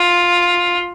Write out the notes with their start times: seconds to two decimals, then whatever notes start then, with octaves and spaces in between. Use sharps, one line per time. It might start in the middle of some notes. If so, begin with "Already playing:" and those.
Already playing: F4